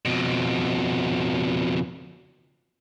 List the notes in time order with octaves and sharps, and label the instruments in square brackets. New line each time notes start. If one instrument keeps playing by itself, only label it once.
[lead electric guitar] F2 B2